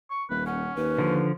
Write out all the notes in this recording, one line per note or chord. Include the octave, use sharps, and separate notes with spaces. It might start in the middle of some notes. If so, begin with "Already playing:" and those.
C#6
D#1 B4
C#4 F#5
D#2 B4
D3 F3